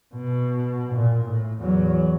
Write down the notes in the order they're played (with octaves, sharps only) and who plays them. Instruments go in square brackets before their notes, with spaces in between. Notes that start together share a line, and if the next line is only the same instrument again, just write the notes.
[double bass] B2
A#2
A2
E2 F#3